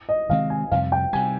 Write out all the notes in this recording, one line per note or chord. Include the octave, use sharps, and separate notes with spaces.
D#5
C3 D#3 G#3 C4 F5
G#5
F2 C3 G3 F5
G5
C3 G3 G#5